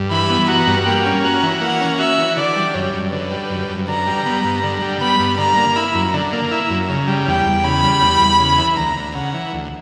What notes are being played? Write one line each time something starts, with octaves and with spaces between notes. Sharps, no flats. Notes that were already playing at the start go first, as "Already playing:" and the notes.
Already playing: G2
E3 B5
B3
F#4 A#5
G2
A#3 G5
C#4
F#4 A#5
E3
A#3 F#5
C#4
F#4 E5
E3
D3 D5
G3
F#2 C#5
F#2
D3 B4
G3
F#2
F#2
D3 A#5
G3
B3
G2
D3
G3
B3 B5
G2
D3 A#5
A#3
E4 B5
F#2
D3 A#5
A#3
E4
F#2
C#3
G3
E2 G5
E2
C#3 B5
G3
E2
E2
C#3
E3
D2 A#5
D2
C#3 F#5
E3
D2